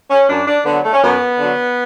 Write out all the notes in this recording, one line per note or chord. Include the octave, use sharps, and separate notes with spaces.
C#4
F#2 D4
D4
D3 F#3 B3
A3
C#4
F#2 B3
D3 F#3